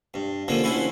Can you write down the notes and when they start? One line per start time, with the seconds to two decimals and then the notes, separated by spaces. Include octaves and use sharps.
0.14 G2
0.48 D3 F3 A#3 C#4
0.63 D2 C#4 E4 F#4 C6